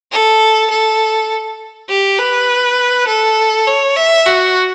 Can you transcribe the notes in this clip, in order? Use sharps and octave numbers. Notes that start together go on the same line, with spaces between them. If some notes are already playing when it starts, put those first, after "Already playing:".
A4
A4
G4
B4
A4
C#5
E5
F#4